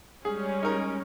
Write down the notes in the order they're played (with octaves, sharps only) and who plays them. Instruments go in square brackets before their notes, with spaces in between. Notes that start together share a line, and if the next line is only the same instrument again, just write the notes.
[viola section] G3 G#3 C#4 [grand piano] G#4
[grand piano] D#4 A#4